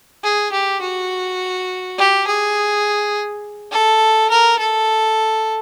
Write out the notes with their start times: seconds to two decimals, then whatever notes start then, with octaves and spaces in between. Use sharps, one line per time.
0.24 G#4
0.52 G4
0.82 F#4
1.98 G4
2.27 G#4
3.72 A4
4.30 A#4
4.59 A4